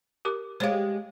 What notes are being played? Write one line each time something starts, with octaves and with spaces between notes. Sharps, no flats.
G4 A#4 D6
G#3 G4 C5 C#5 F5